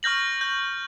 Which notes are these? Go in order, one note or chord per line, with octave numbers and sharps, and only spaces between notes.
C#6 F6 G6 A#6 F#7
G6